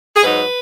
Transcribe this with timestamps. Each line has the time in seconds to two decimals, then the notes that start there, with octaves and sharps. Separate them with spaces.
0.16 G#4
0.22 G#2 F#3 D#4 B4